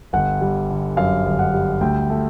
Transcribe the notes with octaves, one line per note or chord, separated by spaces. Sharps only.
G1 F#5
G3
D3
F#2 F5
G1
F#5
G3
D2 G5
A3